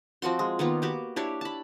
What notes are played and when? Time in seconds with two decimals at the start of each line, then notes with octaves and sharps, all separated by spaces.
0.22 F3 C4 F#4 C6
0.39 G#3
0.59 D#3 A#3 B3 F4
0.82 F#4 G4 D6
1.16 D4 E4 G4 C#5
1.41 A5 B5